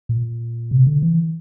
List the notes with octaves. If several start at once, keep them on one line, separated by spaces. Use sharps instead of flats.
A#2
C3
D3
E3